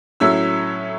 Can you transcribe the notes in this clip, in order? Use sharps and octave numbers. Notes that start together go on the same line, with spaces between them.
A2 F#3 C#4 E5 E6